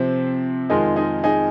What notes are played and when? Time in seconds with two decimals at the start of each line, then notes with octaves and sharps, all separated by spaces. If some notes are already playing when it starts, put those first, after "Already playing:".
Already playing: C3 F3 C4 C5
0.70 F2 D#3 G#3 D#4 F4 G#4
0.96 D#4 G#4
1.24 D#4 G#4